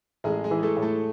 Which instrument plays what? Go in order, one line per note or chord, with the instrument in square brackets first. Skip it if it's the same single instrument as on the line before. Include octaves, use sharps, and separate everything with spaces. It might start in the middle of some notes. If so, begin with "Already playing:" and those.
[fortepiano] A1 [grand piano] G#3 G#4
[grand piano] G#3 G#4
[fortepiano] E3
[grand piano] G#4
A3 A4
[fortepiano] A2
[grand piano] A3 A4